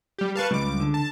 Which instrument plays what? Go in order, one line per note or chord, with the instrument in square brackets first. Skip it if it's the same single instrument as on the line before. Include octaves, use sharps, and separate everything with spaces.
[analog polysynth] G3 G4
[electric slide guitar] A#4 B4 [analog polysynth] F5 A5 C#6
[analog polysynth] C#2 D6 [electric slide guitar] G3
[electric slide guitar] D3
[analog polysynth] A5